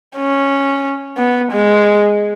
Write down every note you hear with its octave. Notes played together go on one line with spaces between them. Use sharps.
C#4
B3
G#3